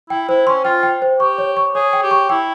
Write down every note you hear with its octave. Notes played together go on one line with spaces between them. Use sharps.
E4 G5
E4 C5
C#4 C6
F4 G5
G5
C5
G4 C#6
C#5
C#6
G#4 C#5
G5
G4
C#6
E4 G5